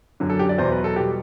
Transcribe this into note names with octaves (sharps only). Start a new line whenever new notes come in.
F#2 D3 F#3
A4
G4
D5
E2 B2 F#3 C5
B4
A4
B2 G3 G4